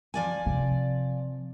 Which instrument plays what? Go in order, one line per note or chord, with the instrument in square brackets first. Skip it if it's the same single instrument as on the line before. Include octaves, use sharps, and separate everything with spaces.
[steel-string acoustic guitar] F3 D5 G#5
[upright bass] C3